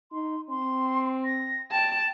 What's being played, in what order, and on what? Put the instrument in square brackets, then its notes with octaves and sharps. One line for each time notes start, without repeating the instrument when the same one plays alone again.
[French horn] D#4 [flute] C6
[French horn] C4 [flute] C6
[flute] A#6
[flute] G5 [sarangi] A5